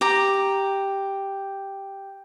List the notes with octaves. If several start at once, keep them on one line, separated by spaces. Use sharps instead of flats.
G4 A#5